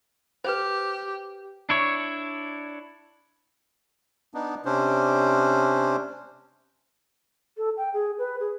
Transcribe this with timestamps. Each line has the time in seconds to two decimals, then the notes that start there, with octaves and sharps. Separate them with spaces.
0.45 G4 B4 C5
1.69 D4 E4 C#5
4.34 B3 D4 D#4
4.65 C3 C#4 D4 C5
7.57 A4
7.77 G5
7.94 G#4
8.18 B4
8.40 G#4